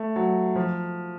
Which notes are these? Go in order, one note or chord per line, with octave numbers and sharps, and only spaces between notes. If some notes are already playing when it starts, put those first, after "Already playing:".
Already playing: A3
F#3
F3